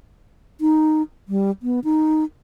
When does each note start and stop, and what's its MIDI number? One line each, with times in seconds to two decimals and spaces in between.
0.61 1.02 63
1.29 1.51 55
1.63 1.80 59
1.84 2.24 63